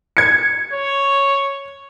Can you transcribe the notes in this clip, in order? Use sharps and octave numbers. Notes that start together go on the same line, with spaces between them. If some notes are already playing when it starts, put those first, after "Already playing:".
G#6 C#7
C#5